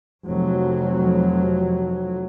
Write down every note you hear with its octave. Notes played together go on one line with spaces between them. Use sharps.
F1 F2 F#3